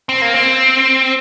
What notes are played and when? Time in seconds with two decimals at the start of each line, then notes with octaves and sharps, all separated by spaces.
0.09 C4
0.22 A#3
0.34 C4